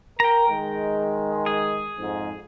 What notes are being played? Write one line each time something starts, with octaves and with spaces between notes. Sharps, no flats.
A#4 G5 A#5
D#3 G#3
G#4
F2 G#2